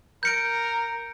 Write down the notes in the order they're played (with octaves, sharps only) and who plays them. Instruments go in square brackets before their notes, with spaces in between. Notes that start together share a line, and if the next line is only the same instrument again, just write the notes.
[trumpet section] A#4 [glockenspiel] G6 C#7 D7